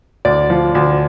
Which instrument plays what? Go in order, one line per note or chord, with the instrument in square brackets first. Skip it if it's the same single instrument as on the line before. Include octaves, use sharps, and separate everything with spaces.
[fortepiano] D2 D5
F3
D2